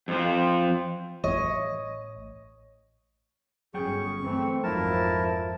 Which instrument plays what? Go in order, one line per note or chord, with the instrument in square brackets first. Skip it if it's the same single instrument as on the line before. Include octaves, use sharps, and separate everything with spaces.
[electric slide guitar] F2 F3
[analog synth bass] A1 [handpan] C#5 [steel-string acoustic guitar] D#5
[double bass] G1 C#4 [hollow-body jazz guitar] F#3 G5 [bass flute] G#4 [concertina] C#6
[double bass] E3 A3 [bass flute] C4
[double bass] G#1 F2 [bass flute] F3 [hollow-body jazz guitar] F#3 D#4 [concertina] E4 A#4 A5